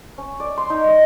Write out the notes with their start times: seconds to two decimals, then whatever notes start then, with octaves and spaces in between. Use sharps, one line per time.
0.18 C#4
0.40 D5
0.57 C6
0.70 D#4
0.88 D#5